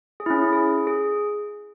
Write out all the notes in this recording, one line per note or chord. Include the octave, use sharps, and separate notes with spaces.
G#4
E4
C#4
E4
G#4
G#4